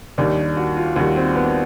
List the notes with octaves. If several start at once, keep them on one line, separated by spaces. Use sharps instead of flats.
D#2 D#3 G3 D4
F#4
F4
D#2 D#3 G3 F#4
C4
B3